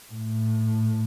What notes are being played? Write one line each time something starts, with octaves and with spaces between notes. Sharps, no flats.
A2